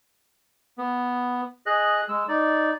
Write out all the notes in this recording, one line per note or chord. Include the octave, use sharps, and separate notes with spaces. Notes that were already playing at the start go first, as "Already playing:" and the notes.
B3
G#4 D#5 F#6
G#3 E6
D#4 D5